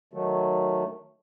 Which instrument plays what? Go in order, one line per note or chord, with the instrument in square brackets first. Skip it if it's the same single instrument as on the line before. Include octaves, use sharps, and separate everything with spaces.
[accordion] D#3 F#3 A3